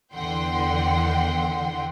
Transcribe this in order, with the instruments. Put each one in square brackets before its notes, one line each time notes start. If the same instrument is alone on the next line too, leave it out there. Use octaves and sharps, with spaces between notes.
[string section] E2 D3 E3 F#5 G5 C6